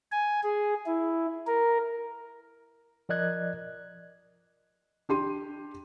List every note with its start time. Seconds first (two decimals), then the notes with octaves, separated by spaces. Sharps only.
0.12 G#5
0.43 G#4
0.86 E4
1.47 A#4
3.09 F3 A#4 D5 D#5 F#6 G#6
5.09 D4 G4 C6 D#7